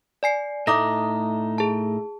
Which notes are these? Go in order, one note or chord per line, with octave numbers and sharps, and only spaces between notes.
D5 G#5 C7
A2 A3 D#4 D6 D#6 A#6
G#4 A5